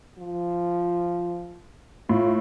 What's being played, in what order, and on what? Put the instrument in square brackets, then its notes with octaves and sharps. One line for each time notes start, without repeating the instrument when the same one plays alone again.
[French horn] F3
[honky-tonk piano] A2 [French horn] F4